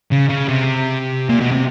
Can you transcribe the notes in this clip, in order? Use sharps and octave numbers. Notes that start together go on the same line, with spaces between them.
C#3
C#3
C3
A#2
B2
C3